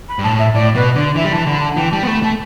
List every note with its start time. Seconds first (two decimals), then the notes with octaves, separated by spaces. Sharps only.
0.09 B5
0.19 G2
0.24 A2 A5
0.39 E5
0.54 A2 D5
0.75 B2 B4
0.95 D3 D5
1.16 E3 E5
1.25 G3
1.32 E3 A5
1.47 D3 B5
1.61 A5
1.77 E3 G5
1.92 G3 A5
2.03 B3
2.07 A3 B5
2.23 A3 A5